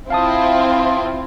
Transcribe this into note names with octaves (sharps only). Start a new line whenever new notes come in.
C4 E4 F4 F5 A5 D#6